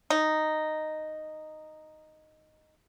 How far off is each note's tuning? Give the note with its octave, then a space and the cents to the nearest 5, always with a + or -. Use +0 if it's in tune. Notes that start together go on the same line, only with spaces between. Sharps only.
D#4 -5